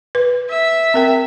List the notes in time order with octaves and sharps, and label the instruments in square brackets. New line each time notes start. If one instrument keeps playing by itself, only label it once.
[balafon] B4
[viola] E5
[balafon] C4 A#4 G5